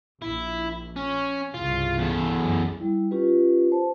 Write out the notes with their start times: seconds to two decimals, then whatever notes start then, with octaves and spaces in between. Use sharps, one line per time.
0.22 A#1 E4
0.97 C#4
1.54 C2 G2 C#3 F4
1.98 E2 A4
2.37 F#2
2.80 G3 E4
3.11 C#4 F4 G4 B4
3.72 C5 A5